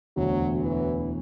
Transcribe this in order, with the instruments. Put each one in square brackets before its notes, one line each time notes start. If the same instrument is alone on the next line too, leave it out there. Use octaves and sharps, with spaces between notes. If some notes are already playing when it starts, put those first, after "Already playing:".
[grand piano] E1 D2 D3 [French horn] F#3
[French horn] E3